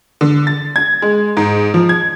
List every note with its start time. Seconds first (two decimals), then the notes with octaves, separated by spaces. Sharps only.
0.21 D3
0.47 A6
0.76 G#6
1.02 G#3
1.37 G#2
1.74 F3
1.89 G#6